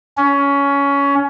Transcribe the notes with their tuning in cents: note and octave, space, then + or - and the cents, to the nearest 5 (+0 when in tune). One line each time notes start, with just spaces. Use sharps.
C#4 +20